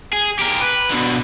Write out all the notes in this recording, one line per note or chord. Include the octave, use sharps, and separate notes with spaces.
G#4
G4 A#4
B4
B2 D3